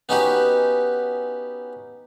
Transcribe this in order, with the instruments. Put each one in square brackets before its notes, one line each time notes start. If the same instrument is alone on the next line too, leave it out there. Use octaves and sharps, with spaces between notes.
[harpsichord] B3 C#4 D#4 F#4 G4 B4